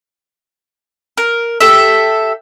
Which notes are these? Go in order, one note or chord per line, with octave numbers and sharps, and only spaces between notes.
A#4
G4 A4 E5